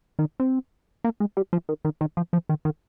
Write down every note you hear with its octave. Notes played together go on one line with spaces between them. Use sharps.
D#3
C4
A#3
G#3
G3
F3
D#3
D#3
D#3
F3
F3
D#3
D#3